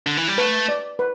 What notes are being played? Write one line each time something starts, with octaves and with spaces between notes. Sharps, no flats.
D3
E3
G3
A3 B4
D5
B4